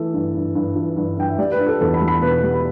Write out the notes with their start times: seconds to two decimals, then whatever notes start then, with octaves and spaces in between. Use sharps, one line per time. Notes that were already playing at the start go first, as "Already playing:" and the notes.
Already playing: E3 A3 A4
0.14 G2
0.34 G2
0.55 G2
0.76 E3
0.97 G2
1.17 G2 G5
1.29 E5
1.38 G3 D5
1.52 B4
1.59 D4
1.66 A4
1.80 E2 A4
1.94 B5
2.01 G3
2.08 B5
2.22 B2 B4
2.43 G3
2.53 B5